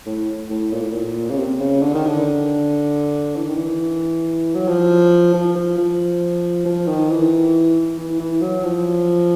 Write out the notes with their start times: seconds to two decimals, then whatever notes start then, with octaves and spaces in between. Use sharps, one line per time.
0.06 A2
0.50 A2
0.72 A#2
0.82 A2
0.92 A#2
1.30 C#3
1.38 C3
1.60 C#3
1.82 D3
1.94 D#3
2.07 D3
3.36 E3
3.46 D#3
3.55 E3
4.55 F#3
4.68 F3
5.34 F3
5.56 F3
5.78 F3
6.66 F3
6.88 D#3
7.10 E3
7.98 E3
8.20 E3
8.42 F#3
8.64 F3